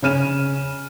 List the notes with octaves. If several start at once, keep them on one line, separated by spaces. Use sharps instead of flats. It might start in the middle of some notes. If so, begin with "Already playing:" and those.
C#3 C#4 F6 D#7 E7